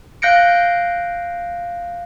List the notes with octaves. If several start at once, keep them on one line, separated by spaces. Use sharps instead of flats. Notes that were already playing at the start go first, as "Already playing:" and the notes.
F5 F#6 G6 A#6 C#7 D7